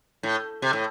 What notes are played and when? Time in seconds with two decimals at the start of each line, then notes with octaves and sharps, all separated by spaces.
0.23 A2
0.62 C3
0.73 A2